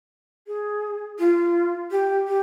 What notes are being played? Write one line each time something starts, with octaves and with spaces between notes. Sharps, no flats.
G#4
F4
G4
G4